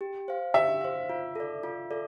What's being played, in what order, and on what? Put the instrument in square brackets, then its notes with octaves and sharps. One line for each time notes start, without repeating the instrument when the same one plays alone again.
[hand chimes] G4
C5 F5
[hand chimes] G4 [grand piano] E5
[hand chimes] C5 F5
F4
A4 D5
F4
A4 D5